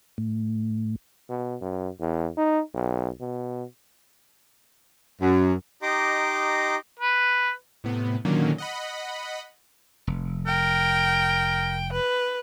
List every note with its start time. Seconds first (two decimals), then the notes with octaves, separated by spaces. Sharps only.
0.18 A2
1.29 B2
1.61 F#2
2.00 E2
2.37 D#4
2.74 B1
3.21 B2
5.21 F#2
5.82 D#4 G4 D#5 A#5 C6 D6
6.99 B4
7.84 A2 C3 B3
8.25 A#2 D3 D#3 F#3 A#3 C#4
8.58 D#5 F#5 B5
10.07 F1
10.47 A#4 G5
11.93 B4